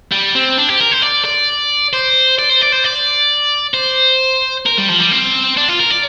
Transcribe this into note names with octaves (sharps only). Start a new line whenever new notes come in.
G3
C4
D4
G4
A#4
C5
D5
D5
C5
D5
C5
D5
C5
D5
C5
A#4
G3
F3
G3
C4
D4
F4
A#4
D5